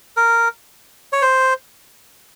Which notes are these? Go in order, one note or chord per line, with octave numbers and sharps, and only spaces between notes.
A#4
C#5
C5